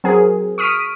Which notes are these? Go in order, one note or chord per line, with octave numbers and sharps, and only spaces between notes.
F#3 C4 G#4 A#4
C#6 D#6 F6 B6 D7 D#7